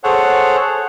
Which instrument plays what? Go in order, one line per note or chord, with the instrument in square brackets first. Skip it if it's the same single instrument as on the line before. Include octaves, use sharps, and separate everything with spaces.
[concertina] G#4 A4 C5 C#5 F#5